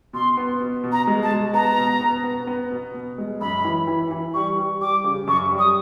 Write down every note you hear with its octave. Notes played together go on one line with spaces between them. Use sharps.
B2 C6
B3
B2
B2
A#5
G#3
A5
G#3
B3 A#5
B2
B3
B3
B3
B2
B2
G#3
F#2 B5
E3
E3
E3
G3 C#6
G3
G3 D6
C#3
F#2 C#6
G3
D#6